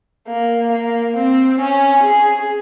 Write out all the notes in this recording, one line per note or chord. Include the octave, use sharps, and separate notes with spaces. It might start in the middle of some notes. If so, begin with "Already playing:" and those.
A#3
A#3
C4
C#4
G#4